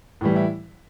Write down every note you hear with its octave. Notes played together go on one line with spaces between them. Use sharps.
A2 E3 G3
E4